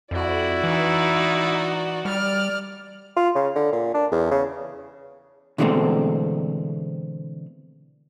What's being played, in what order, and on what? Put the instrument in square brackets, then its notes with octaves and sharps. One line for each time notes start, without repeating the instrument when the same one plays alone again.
[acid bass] F2 [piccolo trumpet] E4 [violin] F#4 D5
[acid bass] E3 [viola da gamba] D#4
[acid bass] G3 [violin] D5 F6
[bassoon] F4
C#3
D3
A#2
D4
E2
C#3
[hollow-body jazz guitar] B2 D3 E3 G#3 A3 C4